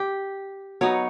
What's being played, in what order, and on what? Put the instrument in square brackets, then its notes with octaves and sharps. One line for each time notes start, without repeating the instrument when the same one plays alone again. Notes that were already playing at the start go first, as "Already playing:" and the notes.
Already playing: [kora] G4
F#3 B3 D#4 C#5